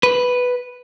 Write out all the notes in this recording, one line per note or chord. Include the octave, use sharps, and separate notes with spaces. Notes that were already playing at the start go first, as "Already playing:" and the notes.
B4